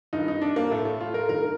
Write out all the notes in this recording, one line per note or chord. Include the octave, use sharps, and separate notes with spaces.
G2 D#3 D#4
D#4
D4
A#3
A2 A3
A3
F4
A#4
G2 D#3 A#4